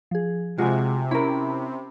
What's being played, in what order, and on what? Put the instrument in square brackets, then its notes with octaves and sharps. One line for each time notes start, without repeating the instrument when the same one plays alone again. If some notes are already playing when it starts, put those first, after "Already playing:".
[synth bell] F3 G#4
[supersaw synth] C3 [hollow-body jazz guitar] G#3 F#4 [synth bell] F4 G#5
[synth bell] C#4 B5 [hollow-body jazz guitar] E4 A#4